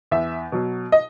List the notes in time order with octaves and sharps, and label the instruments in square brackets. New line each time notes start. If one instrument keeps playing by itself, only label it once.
[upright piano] E2 E5
B2 F#3
D#5